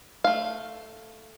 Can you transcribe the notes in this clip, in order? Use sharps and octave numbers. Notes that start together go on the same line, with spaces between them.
A3 F5